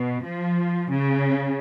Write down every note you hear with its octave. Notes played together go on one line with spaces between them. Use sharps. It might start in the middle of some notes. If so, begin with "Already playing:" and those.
Already playing: B2
F3
C#3